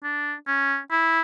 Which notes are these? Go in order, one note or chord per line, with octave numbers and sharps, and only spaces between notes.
D4
C#4
E4